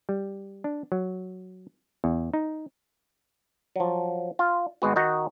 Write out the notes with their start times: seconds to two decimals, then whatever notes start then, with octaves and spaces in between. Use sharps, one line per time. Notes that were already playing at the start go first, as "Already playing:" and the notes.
0.09 G3
0.64 D4
0.92 F#3
2.04 E2
2.34 D#4
3.76 F3 F#3
4.39 F4
4.82 G#1 G#3 B3 F#4
4.96 D#3 D#4 F#4